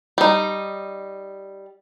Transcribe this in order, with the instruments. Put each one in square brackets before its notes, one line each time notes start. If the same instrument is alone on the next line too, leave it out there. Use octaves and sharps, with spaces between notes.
[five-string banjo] G3 D#4